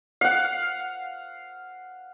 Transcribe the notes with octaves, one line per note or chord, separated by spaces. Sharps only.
F5 F#5